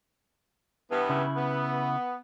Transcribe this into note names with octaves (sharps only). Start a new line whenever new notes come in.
G2 E3 B3
C#3 E4
B3